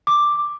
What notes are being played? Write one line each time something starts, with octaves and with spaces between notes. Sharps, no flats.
D6